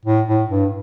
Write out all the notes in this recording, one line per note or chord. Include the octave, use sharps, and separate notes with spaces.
A2
A2
G2